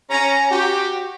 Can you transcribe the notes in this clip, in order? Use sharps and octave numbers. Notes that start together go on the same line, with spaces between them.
C#4 A#5
F#4 G4